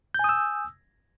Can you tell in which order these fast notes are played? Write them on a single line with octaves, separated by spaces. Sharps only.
G6 G#5 D#6 E6